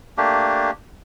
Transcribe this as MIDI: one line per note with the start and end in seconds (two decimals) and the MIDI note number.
0.17 0.71 57
0.17 0.71 58
0.17 0.71 62
0.17 0.71 67